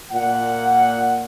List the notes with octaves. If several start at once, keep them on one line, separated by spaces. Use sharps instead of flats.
A#2 F#5